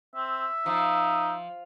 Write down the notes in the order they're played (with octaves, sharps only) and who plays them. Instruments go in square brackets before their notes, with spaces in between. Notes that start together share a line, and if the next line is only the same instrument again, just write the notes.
[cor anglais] C4 [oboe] E5
[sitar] F3 [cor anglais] D#4